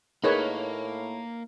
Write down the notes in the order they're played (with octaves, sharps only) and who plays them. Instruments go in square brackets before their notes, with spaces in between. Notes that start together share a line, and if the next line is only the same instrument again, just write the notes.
[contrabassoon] A2 [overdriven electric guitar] A#3 [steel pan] D#4 B4 C#5 [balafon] G#4 A#4